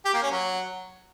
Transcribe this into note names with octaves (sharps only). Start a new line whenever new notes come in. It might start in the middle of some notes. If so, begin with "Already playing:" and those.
G4
A#3
C#4
F#3